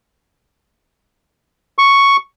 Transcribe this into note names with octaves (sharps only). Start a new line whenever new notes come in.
C#6